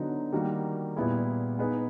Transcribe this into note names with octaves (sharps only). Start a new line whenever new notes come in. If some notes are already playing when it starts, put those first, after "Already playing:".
Already playing: D3 F#3 B3 D#4 F#4
D#3 G3 A#3 D#4 F#4
A#2 G3 B3 E4 G#4
B3 D#4 G#4 B4